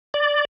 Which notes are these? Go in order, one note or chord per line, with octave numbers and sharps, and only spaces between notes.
D5